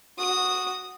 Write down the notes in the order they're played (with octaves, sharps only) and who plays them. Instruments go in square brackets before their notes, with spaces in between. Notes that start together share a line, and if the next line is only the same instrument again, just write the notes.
[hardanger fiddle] F#4 D#6